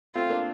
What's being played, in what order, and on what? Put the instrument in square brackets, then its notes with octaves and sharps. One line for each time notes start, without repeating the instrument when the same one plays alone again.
[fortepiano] A3 C4 [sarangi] F4
[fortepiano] A#3 D4